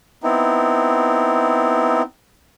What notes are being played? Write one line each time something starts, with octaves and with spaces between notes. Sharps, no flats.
B3 C4 D#4 E4